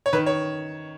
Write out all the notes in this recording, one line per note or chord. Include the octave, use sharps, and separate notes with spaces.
C#5
D#3 B4
C#5